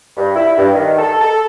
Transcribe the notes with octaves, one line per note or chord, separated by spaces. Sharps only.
G2
E4
G2
D#3
A4
A4